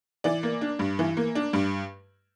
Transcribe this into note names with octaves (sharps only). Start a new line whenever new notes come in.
E3 D5
A#3
D4
G2
E3
A#3
D4
G2